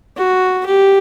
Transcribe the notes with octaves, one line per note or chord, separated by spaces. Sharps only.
F#4
G4